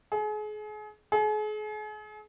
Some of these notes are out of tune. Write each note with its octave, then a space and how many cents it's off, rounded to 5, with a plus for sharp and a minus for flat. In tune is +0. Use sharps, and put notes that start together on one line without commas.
G#4 +35
G#4 +40